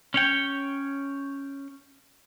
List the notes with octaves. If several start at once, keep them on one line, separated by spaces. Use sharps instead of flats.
C#4 C#5 G5